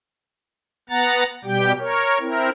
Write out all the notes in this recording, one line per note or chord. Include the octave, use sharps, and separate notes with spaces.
B3 F#5 A#5 A6
B2 G3 G4 G5
A#4 C#5
C4 E4 A#4